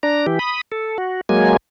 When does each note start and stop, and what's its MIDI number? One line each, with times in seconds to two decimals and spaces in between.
0.03 0.26 62
0.03 0.26 82
0.27 0.39 52
0.27 0.39 67
0.39 0.61 83
0.39 0.61 87
0.72 0.98 69
0.98 1.21 66
1.29 1.57 54
1.29 1.57 56
1.29 1.57 58
1.29 1.57 80